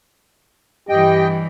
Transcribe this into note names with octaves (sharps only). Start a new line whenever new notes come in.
G2 E3 G4 D#5 G5